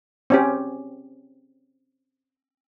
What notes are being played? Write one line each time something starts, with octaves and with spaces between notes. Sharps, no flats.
C4 C#4 G4